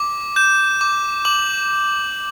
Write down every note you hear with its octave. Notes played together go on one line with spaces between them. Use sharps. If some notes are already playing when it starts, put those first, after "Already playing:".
Already playing: D6
G6 E7
D6
D6 F#7